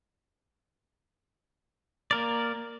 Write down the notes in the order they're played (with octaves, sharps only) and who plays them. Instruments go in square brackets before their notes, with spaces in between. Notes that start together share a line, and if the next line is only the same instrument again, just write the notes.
[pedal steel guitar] A#3 A#4 D5